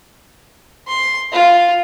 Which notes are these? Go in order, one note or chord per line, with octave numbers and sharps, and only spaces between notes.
C6
F4